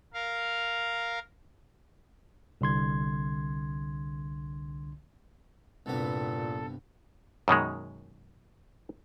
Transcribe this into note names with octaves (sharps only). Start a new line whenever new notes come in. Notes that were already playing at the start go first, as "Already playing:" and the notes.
A#4 F5
C2 D3 C6 G#6
C2 G2 A#2 B3 A4
F#2 B2 D#3 G#3